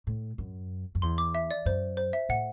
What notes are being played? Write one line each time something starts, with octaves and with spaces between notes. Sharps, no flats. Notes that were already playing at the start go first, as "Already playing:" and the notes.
A2
F#2
F#2
E2 C6
D6
E5
D5
F#2 C5
C5
E5
A2 F#5